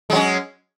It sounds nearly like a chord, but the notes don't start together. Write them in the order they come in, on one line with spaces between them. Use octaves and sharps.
G#3 F#3 C#4